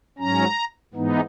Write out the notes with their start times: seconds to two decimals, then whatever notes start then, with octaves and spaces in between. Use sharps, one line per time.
0.18 G#2 F#3 C#4 A#5
0.94 G#2 E3 B3 D#4